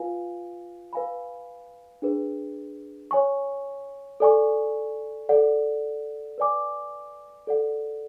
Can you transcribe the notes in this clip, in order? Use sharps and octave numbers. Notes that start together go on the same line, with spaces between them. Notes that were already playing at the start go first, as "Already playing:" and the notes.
Already playing: F4 B4 F5 G#5
B4 F5 G#5 B5
D4 G#4 B4
C#5 G#5 C#6
A4 D5 G#5 C#6
A4 D5 F#5
B4 D5 G#5 D6
A4 D5 F#5